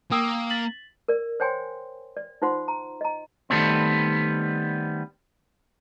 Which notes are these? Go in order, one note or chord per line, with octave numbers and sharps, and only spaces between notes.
A#3 G5 D#6 E6
A6 B6 F#7
A#4 D5
C5 C#5 G5 G#5 C6
D5
D#4 F4 C5 F#5 C6
A#5
D#5 A#5
D#3 G3 A3 B3 C4